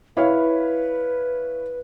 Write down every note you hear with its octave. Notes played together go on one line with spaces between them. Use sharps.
E4 B4 C#5 F5